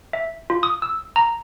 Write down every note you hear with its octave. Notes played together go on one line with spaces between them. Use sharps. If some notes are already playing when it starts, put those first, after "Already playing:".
E5
F4
D#6
E6
A#5